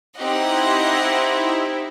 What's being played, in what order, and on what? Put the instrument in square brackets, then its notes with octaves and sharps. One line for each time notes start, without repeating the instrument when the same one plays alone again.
[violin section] C4 D#4 G4 [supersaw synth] E4 [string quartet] D#5 F#5